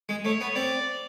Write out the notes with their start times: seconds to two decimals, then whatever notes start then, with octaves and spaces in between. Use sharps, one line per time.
0.09 G#3
0.25 A3 C#5
0.41 B3
0.55 C4 D5